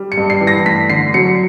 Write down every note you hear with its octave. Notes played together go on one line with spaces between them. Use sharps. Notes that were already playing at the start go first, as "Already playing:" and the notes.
Already playing: G3
C#7
G2
C7
E3
A#6
A3 B6
D3 C7
F#3 C#7